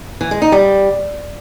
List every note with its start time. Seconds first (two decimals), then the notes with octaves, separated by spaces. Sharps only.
0.21 E3
0.31 G#3
0.42 D#4
0.52 G3